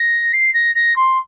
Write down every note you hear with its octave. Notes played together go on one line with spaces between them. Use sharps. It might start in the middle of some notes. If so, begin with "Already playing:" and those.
Already playing: A#6
C7
A#6
A#6
C6